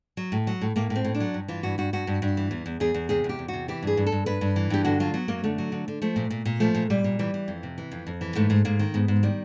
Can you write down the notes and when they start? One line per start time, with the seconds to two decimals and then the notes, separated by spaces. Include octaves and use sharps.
0.17 F#3
0.32 A2
0.47 F#3
0.61 A2
0.76 A2 A#3
0.90 A2
0.95 C4
1.04 A2
1.15 D4
1.20 F#3
1.34 G2
1.48 E3 F4
1.63 G2 F#4
1.78 G2 F#4
1.93 G2 F#4
2.07 G2
2.22 G2
2.37 E3
2.51 E2
2.66 E2
2.80 E2 G#4
2.94 E2
3.09 C3 G#4
3.24 E2
3.29 G4
3.39 E2
3.48 C3 F#4
3.68 E3 G4
3.82 G2 G#4
3.97 G2
4.06 A4
4.12 G2
4.26 G2 B4
4.41 G2
4.56 E3
4.70 G2 G4
4.84 D3 F#4
5.00 F#3 F4
5.14 F#3 B3
5.28 F#2 A#3
5.44 D3 A3
5.58 F#3
5.72 D3
5.88 D3
6.02 F3 A3
6.16 A#2
6.30 A#2
6.45 A#2
6.60 F3 A3
6.75 A#2
6.90 A#2 G3
7.04 A#2
7.19 E3 G3
7.34 E3
7.48 F2
7.63 C3
7.78 E3
7.92 F2
8.07 F2
8.21 E3
8.35 G#2 A3
8.50 G#2
8.65 G#2 A#3
8.79 D#3
8.94 G#2 B3
9.08 G#2
9.23 D#3 G3